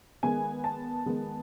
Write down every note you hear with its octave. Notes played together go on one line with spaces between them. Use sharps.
D#3 G#3 B3 G#5
A5
D#3 G#3 B3